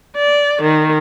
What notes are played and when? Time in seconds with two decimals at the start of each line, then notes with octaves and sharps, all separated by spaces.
0.17 D5
0.62 D#3